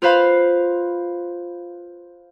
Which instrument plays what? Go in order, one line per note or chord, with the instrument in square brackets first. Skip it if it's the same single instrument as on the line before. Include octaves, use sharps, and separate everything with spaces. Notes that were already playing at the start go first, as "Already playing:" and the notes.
[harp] F4 B4 C5 F5 B5